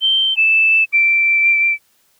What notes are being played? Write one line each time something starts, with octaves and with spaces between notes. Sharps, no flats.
G7
E7
D7